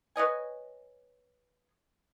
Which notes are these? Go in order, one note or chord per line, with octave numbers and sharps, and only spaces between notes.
B4 C#5 D#5 G#5